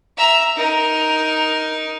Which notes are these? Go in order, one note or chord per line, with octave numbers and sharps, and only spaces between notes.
E5 A#5
D#4 A#4